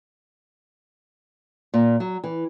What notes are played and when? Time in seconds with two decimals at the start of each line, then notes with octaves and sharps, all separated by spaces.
1.74 A#2
2.00 F#3
2.24 E3